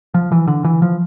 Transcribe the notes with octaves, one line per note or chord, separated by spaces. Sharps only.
F3
E3
D3
E3
F3